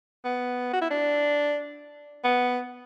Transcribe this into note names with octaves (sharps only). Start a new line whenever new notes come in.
B3
F#4
E4
D4
B3